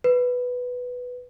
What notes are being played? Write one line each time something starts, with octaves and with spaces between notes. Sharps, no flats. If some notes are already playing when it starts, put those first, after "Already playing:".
B4